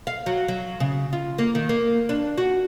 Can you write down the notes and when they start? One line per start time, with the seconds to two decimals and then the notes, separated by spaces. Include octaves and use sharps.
0.07 F5
0.26 F#3
0.48 F#3
0.80 C#3
1.13 F4
1.38 A#3
1.55 D#3
1.69 A#3
2.09 D4
2.38 F#4